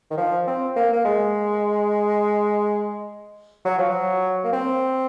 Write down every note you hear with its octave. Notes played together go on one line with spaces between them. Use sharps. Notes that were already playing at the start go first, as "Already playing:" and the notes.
D#3
F3
C4
A#3
A#3
G#3
F#3
F3
F#3
A#3
C4